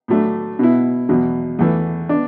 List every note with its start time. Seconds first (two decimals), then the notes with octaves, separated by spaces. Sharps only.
0.08 A2 F#3 A3 D4
0.59 B2 B3 E4
1.09 E2 B2 F#3
1.59 E2 E3 A3
2.09 B3 D4